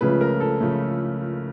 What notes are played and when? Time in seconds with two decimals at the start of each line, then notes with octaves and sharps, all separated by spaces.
0.01 C#2 C#3 F3 A3 B4
0.21 A#4
0.40 A4
0.60 C#3 F3 A3